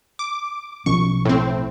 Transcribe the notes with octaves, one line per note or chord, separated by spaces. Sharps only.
D6
B1 F3 C#4 C#6
A2 C4